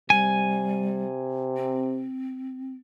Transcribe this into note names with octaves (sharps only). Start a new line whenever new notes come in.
C3 G3 G#5
C4